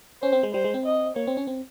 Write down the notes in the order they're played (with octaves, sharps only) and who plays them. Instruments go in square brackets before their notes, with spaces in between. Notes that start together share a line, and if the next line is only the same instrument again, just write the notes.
[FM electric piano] C#4 [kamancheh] C5
[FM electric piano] C4
G#3
[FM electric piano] G3 [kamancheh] C5
[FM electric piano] G#3
C4
[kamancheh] D#5
[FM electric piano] A#3 [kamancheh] C#5
[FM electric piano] C4
C#4
C4